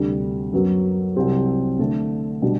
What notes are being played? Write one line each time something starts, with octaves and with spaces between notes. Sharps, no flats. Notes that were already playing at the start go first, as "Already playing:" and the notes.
Already playing: D2 C3 G3
F#2 F#3 B3 F#4
C2 C3 F#3 C4 G4
D3 A3 D4 A4
B2 G3 D4